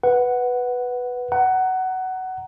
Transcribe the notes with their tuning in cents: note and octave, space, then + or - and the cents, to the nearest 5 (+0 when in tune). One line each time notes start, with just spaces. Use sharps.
B4 +0 F#5 +0
F#5 +15 A#5 +0